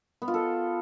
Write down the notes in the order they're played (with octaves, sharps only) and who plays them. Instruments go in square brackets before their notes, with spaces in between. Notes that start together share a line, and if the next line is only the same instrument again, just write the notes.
[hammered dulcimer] B3
F4
A4